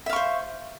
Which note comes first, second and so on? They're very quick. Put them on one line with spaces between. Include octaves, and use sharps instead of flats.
E5 F5 C#6 C5